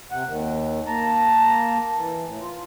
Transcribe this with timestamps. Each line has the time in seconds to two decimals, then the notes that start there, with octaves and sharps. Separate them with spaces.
0.11 C3 F#5
0.28 D#2 D#3
0.86 A#3 A5 A#5
1.96 E3
2.25 A2
2.40 F4